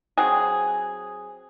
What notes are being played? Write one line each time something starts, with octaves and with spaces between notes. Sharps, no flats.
F#3 C4 G#4